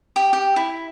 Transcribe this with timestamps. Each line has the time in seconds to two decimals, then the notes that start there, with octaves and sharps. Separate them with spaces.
0.16 G4
0.33 G4
0.56 E4